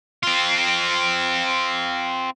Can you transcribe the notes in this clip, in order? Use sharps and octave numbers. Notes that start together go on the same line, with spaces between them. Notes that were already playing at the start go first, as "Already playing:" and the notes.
C4 F4